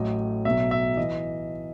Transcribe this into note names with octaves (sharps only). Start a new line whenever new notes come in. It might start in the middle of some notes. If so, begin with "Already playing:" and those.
Already playing: A1 A2 F#3 D#5
B1 B2 F#3 E5
E5
E3 D#5